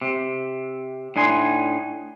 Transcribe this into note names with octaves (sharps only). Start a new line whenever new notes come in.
C3
A2 D4 D#4 G#5 C6